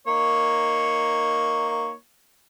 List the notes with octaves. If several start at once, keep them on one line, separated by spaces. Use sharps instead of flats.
A#3 D#4 C#5